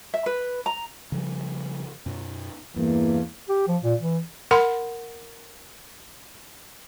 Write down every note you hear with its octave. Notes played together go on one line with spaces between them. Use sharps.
E5
B4
A#5
C#3 F3 G3
F#2 B2
E2 G2 E3 A#3
G4
F3
A#2
E3
A#4 F#5 B5 C6